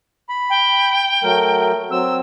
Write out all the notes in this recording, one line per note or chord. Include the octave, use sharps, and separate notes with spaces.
B5
G5
F#3 A3 A#4
F#3 C4 E6